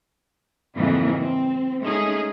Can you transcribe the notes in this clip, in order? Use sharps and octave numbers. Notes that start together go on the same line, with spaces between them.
F2 G#2 C#3 E3 F#3 A#3
C4
G#3 A3 C#4 D#4 G#4